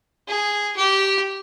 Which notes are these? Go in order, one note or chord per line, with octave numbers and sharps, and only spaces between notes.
G#4
G4